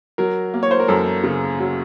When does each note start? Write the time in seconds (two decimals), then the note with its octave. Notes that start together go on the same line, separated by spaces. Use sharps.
0.18 F#3 A#4
0.54 A#3
0.63 C#5
0.71 C5
0.80 A#4
0.88 F#2 A4
1.23 C#3
1.59 F#3